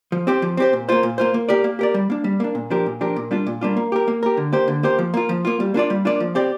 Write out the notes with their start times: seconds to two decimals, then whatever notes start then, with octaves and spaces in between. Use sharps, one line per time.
0.12 F3
0.27 C4 G4 C5
0.42 F3
0.57 C4 G4 C5
0.73 A#2
0.89 A#3 F4 C5
1.03 A#2
1.18 A#3 F4 C5
1.34 A#3
1.49 G4 A#4 D5
1.64 A#3
1.79 G4 A#4 D5
1.94 G3
2.10 A#3 D4
2.24 G3
2.40 A#3 D4
2.55 A#2
2.70 F3 D4 G4 A#4
2.86 A#2
3.01 F3 D4 G4 A#4
3.16 A#2
3.31 G3 A#3 D4 F4
3.47 A#2
3.61 G3 A#3 D4 F4
3.77 A#3
3.92 G4 A#4
4.08 A#3
4.23 G4 A#4
4.37 D3
4.53 A#3 G4 C5
4.68 D3
4.83 A#3 G4 C5
4.99 F3
5.14 A#3 F4
5.29 F3
5.45 A#3 F4
5.60 G3
5.74 A#3 D4 F4 D5
5.90 G3
6.05 A#3 D4 F4 D5
6.20 F3
6.35 C4 G4 D5